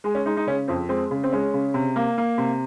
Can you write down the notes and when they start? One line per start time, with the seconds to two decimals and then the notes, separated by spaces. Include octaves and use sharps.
0.04 G#3 G#4
0.15 C#4
0.26 G#3 D#4
0.37 D#4
0.47 C#3 C#4
0.68 F2 C4
0.89 G#3 C4
1.11 C#3
1.24 C4
1.32 G#3 C#4
1.54 C#3
1.74 C3
1.96 A#3
2.18 A#3
2.38 C3